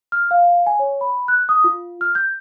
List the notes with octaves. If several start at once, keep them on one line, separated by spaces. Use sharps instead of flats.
F6
F5
G#5
C#5
B5
F#6
D#6
F4
F6
G6